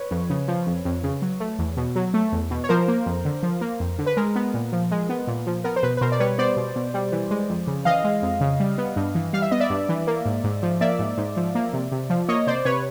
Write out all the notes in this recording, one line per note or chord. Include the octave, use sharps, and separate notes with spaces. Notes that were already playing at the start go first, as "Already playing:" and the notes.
Already playing: B4 C#5
F2
C#3
F3
F2
F2
C#3
F#3
A3
E2
B2
F#3
A3
E2
B2
C#5
F3 A#4 C5
A#3
F2
D3
F3
A#3
F2
D3
B4
G#3 A#4
B3
A#2
F3
G#3
B3
A#2
F3
B3 A#4
C5
B2 B4
B4
B2 A#4 C5
D5
G3 B4 C#5
B3 C5 D5
B2
B2
G3
E3
G#3
F2
C#3
E3 D#5 F5
G#3
F2
C#3
G3
B3
G2
E3
G3 F5
E5
B3 D#5
D5 E5
G2
E3
A#3
G#2
G#2
F3
A#3 D5 E5
G#2
G#2
F3
A#3
C3
C3
F3
A#3 C#5 D#5
C3 C5 D5
C3 B4 C#5